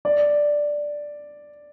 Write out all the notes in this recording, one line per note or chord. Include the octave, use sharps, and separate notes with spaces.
D5